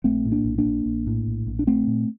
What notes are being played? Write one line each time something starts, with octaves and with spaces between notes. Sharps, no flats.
A#1 A3 C4
A2
A#3 D4
A#1
A#3 D4
A#1
A#1
A2
A#1
A#1
D4
A#2 A3 C4
A#2